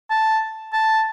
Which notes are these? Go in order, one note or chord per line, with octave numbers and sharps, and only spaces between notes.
A5
A5